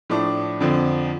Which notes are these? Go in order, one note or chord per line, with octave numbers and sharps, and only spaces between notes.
A2 F3 A3 D4
F2 D3 F3 C4